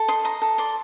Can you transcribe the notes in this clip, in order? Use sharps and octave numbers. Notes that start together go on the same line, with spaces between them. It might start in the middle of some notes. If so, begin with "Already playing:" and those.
Already playing: A4
D#5 C6
D#5 A#5
A4
D5 C6